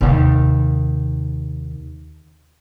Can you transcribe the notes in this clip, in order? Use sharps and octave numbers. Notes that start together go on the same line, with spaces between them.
D#2 C3